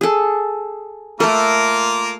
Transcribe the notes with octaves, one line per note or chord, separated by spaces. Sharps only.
G#4 A4
A3 A#3 F4 A4 A#4